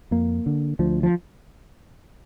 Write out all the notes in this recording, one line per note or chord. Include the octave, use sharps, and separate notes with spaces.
F2 A#3
D3
D2 F3
F3